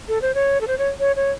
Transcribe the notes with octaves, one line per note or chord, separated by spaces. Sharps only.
A4
C5
C#5
A4
C5
C#5
C#5
C#5